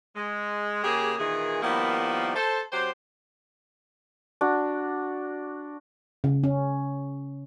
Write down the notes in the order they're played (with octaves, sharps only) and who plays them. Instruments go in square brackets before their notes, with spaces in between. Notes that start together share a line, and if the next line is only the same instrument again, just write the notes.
[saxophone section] G#3
C#3 A#3 G4 G#4
A#2 D#3 E3 G#4
D#3 F3 G3 A#3 B3 E4
A4 C5
F#3 C4 G4 C5
[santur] D4 F#4
[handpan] C#3
C#4